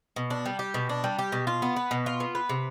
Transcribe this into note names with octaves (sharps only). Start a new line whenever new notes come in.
B2
D4
G3
G4
B2
D4
G3
G4
B2
F4
B3
B4
B2
F4
B3
B4
C3